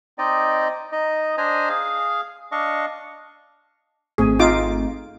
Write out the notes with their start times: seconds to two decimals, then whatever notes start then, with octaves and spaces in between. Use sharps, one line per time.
0.18 C4 D#4 D5 D#5
0.92 D#4 D#5
1.38 D4 C5 D#5 G#5 A#5
1.69 G#4 F5
2.52 D4 D#5 F5 C#6
4.18 G#1 A3 C4 G#4
4.39 D#4 F4 D6